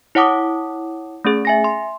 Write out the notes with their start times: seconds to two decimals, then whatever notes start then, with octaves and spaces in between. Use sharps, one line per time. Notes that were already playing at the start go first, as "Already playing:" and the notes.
0.15 E4 C#5 F#5 A5 D6 D#6
1.25 A3 C#4 G#4
1.45 E5 G#5 A#6
1.64 C6